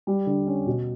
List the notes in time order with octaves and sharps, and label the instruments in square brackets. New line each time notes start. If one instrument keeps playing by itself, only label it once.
[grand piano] G3
D3
C#4
B2